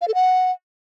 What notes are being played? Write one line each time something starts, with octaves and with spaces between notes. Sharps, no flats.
F5
A4
F#5